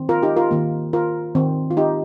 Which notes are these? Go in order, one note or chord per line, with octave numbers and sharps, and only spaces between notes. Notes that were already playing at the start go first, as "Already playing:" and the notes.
Already playing: D#3 C4
F4 A#4
D#4 G4
F4 A#4
D#3 A#3
F4 A#4
D#3 C4
F4
D#4 G4